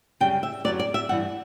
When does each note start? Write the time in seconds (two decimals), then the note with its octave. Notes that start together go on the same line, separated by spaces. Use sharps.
0.20 F#2 C#3 G3 G5
0.43 E5
0.64 F#2 C#3 F#3 B3 D5
0.79 D5
0.94 E5
1.09 G2 E3 B3 F#5